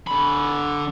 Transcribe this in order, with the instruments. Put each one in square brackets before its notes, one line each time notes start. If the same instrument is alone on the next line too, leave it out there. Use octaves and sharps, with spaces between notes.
[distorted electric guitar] D3 B5